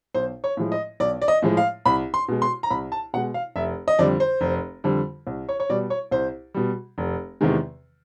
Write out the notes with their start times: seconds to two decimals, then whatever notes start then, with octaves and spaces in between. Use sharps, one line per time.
0.15 B1 C5
0.44 C#5
0.57 A2 F3 G#3
0.72 D#5
1.00 B1 D5
1.22 D5
1.28 D#5
1.42 A2 F3 G#3
1.57 F5
1.86 C2 B5
2.14 C6
2.28 B2 G#3
2.42 C6
2.63 A#5
2.70 C2 B5
2.92 A5
3.14 B2 F#5
3.17 G#3
3.34 F5
3.56 F1 E5
3.88 D#5
3.99 F2 D3 G3 D5
4.20 C5
4.41 F1
4.84 F2 D3 G3
5.27 C2
5.49 C#5
5.60 C#5
5.70 B2 G3 D5
5.90 C#5
6.11 C2 C5
6.54 B2 G3
6.98 F1
7.41 E2 C3 D#3 G#3